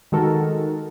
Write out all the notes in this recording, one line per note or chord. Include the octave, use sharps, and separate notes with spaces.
D#3 G#3 F#4 A4 A#4